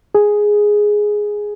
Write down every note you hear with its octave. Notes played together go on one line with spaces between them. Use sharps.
G#4